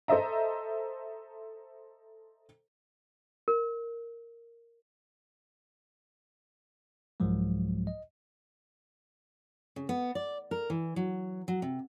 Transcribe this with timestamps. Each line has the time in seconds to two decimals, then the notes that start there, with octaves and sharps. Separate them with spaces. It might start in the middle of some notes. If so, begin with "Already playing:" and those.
0.08 A4 C5 D#5 E5 A#5
3.48 A#4
7.20 C2 G#2 F3 F#3 G#3
7.87 D#5
9.76 C#3
9.89 B3
10.15 D5
10.51 A#4
10.70 E3
10.96 F#3
11.48 F#3
11.62 C3